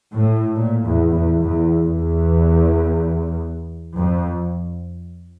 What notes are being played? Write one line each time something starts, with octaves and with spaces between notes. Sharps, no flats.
A2
A#2
E2
E2
E2
E2
F2